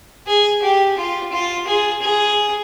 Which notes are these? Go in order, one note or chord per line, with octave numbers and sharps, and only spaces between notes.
G#4
G4
F4
F4
G#4
G#4